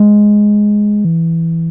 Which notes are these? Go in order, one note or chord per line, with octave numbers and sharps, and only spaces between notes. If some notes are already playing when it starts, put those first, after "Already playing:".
Already playing: G#3
E3